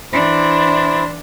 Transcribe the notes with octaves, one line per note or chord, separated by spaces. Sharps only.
E3 D4 E4 C5